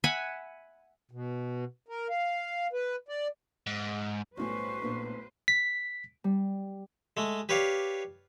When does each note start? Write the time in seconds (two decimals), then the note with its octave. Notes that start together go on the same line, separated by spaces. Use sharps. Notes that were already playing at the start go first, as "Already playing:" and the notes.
0.04 E5 F#5 G#5 B5
1.11 B2
1.89 A#4
2.10 F5
2.73 B4
3.09 D5
3.67 G#2
4.37 B1 A2 G3 C#4 B4 C5 C#6
4.82 A#2 B3 D4
5.48 B6
6.24 G3
7.17 G#3 A3
7.49 G4 B4 C#5 D5 F5